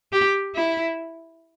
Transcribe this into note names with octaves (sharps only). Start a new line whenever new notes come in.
G4
E4